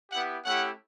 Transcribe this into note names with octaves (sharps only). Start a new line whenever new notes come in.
B3 E4 G4 F#5
A3 C#4 E4 G4 F#5